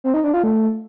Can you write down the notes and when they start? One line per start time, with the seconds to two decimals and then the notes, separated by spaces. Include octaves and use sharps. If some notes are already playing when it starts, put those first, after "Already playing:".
0.04 C4
0.14 D#4
0.24 D4
0.34 F4
0.44 A3